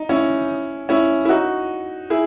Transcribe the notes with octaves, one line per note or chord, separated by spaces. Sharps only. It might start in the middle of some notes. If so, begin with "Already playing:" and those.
Already playing: D#4
C#4 E4
C#4 E4
E4
D#4 F#4
E4 G#4